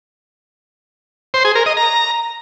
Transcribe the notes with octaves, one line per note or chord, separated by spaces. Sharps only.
C5
G#4
A#4
D#5
A#5